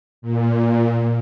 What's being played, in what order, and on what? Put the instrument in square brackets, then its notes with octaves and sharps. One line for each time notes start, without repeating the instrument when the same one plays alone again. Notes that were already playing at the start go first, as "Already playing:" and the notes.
[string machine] A#2